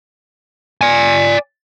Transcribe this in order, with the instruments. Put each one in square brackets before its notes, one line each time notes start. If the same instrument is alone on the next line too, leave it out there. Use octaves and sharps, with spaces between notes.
[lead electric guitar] D5 G#5